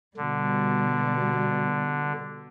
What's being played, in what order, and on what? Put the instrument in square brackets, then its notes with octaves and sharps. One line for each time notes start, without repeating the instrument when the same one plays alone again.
[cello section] B2 G3 [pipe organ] D3